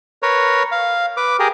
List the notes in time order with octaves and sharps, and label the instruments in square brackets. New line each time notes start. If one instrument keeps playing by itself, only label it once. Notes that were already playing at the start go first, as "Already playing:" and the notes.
[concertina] A#4 B4 C#5
F5
B4 D6
G4 G#4 A#4